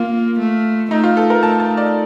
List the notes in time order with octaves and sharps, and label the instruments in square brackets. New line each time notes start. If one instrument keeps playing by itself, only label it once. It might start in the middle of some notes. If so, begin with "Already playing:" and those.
Already playing: [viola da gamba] A#3 [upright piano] F4
[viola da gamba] A3
[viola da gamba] A3 [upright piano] D#4
[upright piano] F4
A4
A#4
[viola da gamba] A3 [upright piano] A5
[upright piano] A5
D5